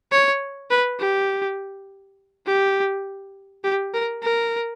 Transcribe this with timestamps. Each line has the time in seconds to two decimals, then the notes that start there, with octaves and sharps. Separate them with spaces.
0.12 C#5
0.71 B4
1.00 G4
2.47 G4
3.64 G4
3.94 A#4
4.23 A#4